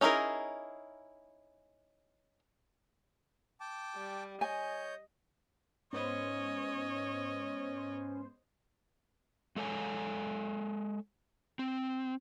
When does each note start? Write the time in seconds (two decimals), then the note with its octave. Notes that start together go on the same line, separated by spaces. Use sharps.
0.01 C#4 D#4 E4 G#4 A#4
3.60 G5 A5 D6
3.96 G3
4.41 C#5 D#5 G#5 G6
5.93 G#2 B3 C#4 C5 C#5 D#5
9.56 G#3 A4 C#5 G#5
11.59 C4